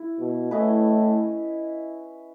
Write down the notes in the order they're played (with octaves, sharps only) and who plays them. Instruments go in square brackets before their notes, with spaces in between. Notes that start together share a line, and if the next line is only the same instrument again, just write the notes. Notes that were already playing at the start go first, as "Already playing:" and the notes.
Already playing: [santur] E4
[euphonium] B2
[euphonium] A2 [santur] C#4 E4 B4 D#5